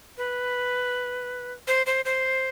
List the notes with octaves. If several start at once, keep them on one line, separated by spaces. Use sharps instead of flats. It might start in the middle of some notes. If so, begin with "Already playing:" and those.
B4
C5
C5
C5